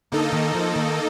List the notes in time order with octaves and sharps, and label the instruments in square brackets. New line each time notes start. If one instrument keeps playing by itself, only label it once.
[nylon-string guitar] D3 [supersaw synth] A#3 D#4 A4 D#5
[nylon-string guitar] D#3
F3
D#3